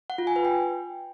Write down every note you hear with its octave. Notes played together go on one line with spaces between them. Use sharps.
F#5
F4
G#5
B4
G5